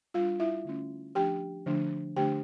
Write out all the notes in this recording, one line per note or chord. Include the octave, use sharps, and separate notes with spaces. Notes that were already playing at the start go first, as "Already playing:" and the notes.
G3 D4 F4 F5
E4 E5
D3 A3 C#4
F3 A3 D4 G4 G5
D3 F3 A3 D4
D3 A3 D4 G4 G5